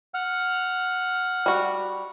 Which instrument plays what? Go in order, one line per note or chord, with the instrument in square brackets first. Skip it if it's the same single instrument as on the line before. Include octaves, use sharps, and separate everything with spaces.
[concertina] F#5 F6
[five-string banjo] G3 F#4